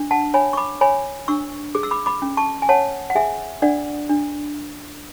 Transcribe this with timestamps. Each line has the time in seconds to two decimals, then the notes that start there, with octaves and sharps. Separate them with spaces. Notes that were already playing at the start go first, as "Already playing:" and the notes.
Already playing: D4
0.11 F#5 A5
0.34 C#5 G#5 B5
0.53 C#6
0.57 B5 D6
0.81 C#5 G#5 B5
1.28 D4 C#6 E6
1.75 G#4 D6
1.83 E6
1.91 B5 D6
2.06 B5 D6
2.22 C#4
2.37 A5 C#6
2.62 G#5
2.69 C#5 F#5 A5
3.10 F#5
3.15 G#4 E5 G#5
3.62 D4 D5 F#5
4.09 D4